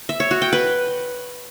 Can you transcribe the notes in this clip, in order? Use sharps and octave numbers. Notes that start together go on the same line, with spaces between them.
E5
C#5
F#4
G5
B4